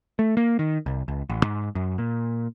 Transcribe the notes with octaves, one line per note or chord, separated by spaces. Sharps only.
A3
A#3
D#3
C2
C#2
A1
G#2
F#2
A#2